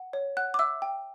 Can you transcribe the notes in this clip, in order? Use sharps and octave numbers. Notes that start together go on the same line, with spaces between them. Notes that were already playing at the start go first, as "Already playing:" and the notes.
Already playing: F#5
C#5
F#5 F#6
D6
E5 E6
G5